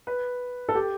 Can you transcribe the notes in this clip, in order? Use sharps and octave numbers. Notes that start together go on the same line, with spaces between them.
B4
A4
G4